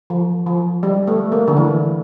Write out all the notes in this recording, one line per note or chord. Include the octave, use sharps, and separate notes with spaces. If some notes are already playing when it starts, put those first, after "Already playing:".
F3
F3
G3
A3
A#3
D3
E3